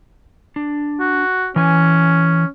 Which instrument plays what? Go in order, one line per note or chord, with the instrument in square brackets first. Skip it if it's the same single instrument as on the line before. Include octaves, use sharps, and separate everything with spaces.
[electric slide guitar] D4
[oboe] F#4
[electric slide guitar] E3 G#5 [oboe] C#4